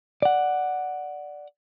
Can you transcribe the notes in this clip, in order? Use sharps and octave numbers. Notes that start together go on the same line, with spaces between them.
D5 F#5